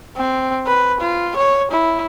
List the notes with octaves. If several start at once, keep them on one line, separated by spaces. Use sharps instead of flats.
C4
B4
F4
C#5
E4